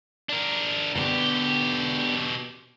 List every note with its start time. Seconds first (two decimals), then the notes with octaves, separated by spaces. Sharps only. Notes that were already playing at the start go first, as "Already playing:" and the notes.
0.29 D4 A#4
0.95 B2 D3 B3 G4